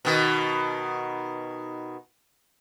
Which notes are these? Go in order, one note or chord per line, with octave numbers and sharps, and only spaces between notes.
B2 D#3